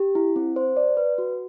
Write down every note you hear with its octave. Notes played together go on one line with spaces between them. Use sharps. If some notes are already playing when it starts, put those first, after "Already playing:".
Already playing: G4
E4
C4
C5
D5
B4
F#4